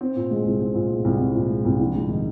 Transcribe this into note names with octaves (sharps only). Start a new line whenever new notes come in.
C4
A#2
G#3
C2
C4
A#2
G#3
C2
C4
A#2
G#3
C2
A#1
G#2
D#3